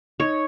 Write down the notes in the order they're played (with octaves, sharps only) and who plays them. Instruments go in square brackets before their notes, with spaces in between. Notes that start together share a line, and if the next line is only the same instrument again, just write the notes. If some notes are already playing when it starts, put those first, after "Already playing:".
[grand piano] D#4 [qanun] C#5